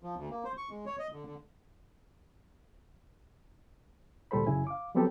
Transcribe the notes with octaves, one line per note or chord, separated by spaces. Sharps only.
F3
D2
A#3
C5
C#6
G#3
C#5
D#5
D3
D3
D2 A#2 G3 A4 C5 B5
F#2 C#3 E4 G#5
F5 D6
F3 F#3 B3 C4 G4 A4